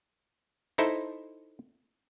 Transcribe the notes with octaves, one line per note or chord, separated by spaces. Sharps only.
D#4 E4 A4 C5